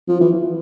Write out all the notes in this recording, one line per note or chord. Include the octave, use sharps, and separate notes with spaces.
F3
E3